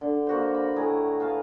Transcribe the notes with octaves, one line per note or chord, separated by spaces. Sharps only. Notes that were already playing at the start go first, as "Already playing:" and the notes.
D3
A#3 F#4 C5
B5
A2 G#4 A#5
B4 F5 A5